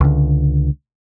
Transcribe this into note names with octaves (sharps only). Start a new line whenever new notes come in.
C#2 D3